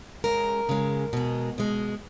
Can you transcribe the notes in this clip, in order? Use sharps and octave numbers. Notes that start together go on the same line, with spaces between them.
C#3 G#3 A#4
C#3 G#3
B2 G#3
B2 G#3